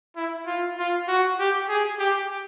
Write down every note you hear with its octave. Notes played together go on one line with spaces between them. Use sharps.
E4
F4
F4
F#4
G4
G#4
G4